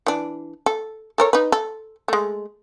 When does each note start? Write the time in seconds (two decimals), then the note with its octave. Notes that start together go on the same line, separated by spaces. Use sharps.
0.06 E3 D4
0.66 A4
1.18 A4 A#4 C#5
1.33 D#4 B4
1.52 A4
2.08 G#3 A3